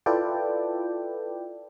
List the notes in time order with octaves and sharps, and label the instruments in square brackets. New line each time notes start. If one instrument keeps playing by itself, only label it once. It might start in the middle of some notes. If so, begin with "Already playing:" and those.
[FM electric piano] E4 F4 A4 B4 D5 G5